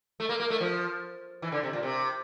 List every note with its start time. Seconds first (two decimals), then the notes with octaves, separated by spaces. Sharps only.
0.20 A3
0.29 A#3
0.40 A#3
0.50 A3
0.61 F3
1.42 E3
1.52 D3
1.63 C3
1.73 A#2
1.83 C3